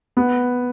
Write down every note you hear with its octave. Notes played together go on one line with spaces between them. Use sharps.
B3